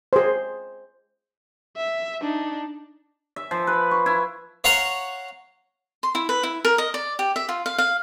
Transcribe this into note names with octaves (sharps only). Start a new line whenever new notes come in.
G#4 C5
E5
D4 D#4
E5
F3
B4
C#6
E4
C#5 F5 F#5 A#5 C6 C#6
C6
E4
B4
E4
A#4
D#5
D5
G4
E5
F4
F5
F5